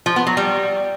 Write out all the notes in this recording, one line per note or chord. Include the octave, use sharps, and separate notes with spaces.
F3
B3
F#3
G3